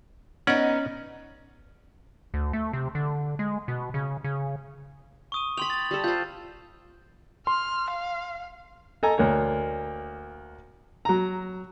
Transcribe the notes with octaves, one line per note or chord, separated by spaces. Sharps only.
B3 C#4 D#4 D5
D2
A3
C3
D3
G#3
B2
C#3
C#3
C#6 D#6 D#7
G5 B5 C6 F7
A6 F#7
G3 A4
F4 C5 G6 A6
C6 F6
F5
A4 D#5 G#5 A#5
D2 A#3 C#5
F#3 A#5